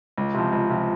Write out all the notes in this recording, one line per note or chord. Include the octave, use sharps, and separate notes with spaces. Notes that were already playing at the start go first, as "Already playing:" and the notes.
C#2
C3 F3
C#2
C3 F3